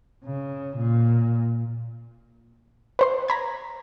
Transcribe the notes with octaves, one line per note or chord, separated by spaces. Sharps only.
C#3
A#2
B4 C5 C6
A#5 B5 G#6